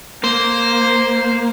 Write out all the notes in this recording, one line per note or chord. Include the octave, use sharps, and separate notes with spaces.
A#3 C5